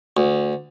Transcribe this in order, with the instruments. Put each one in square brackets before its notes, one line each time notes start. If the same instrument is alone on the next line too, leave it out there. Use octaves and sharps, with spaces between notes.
[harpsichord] D2